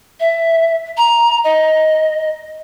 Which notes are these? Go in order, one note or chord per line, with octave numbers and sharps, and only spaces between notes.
E5
A#5
D#5